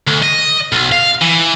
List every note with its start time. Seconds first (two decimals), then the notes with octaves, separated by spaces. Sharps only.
0.08 D2
0.23 D#5
0.72 B1
0.92 F5
1.21 E3